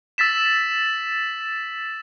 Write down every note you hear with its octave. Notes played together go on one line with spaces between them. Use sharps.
E6 A6 B6 E7